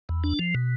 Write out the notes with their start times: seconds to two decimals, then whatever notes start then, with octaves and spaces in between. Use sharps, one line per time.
0.09 E2
0.24 D4
0.39 F3
0.55 B2